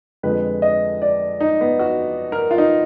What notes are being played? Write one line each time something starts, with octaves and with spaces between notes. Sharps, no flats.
F2 D3 G#3 B4
D#5
D5
D#4
B3
F#4
A#4
F4
D#4